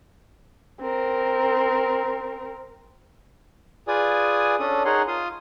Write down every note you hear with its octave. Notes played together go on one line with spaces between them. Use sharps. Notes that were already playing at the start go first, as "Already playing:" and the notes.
C4 A#4
F4 G#4 B4 D5 G#5 D#6
C#4 D4 A4 D#6
D#4 G#4 A#4 C#5 F#5 C6
F4 F5 C6 D#6